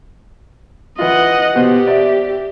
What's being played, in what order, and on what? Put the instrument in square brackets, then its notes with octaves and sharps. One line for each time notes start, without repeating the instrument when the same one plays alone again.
[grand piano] E3 F4 [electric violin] D#5 F#5
[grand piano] B2 C5 [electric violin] G4
[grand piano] D5 E5